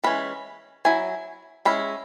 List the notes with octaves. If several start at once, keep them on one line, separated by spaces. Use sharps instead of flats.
E3 G#3 C#4 B5
F#3 E4 G#5
G#3 C#4 E4 B5